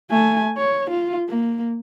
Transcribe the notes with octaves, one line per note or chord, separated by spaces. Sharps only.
A3 G#5
C#5
F4
A#3